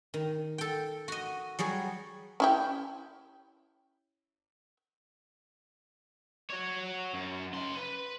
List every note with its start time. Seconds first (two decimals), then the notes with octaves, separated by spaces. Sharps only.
0.14 D#3
0.58 A4 G5
1.08 F#4 D#5
1.59 F#3 G3 G#4 C#5
2.40 C#4 E4 G4
6.50 F#4 C#5
7.14 F#2
7.53 C#3 C6
7.75 B4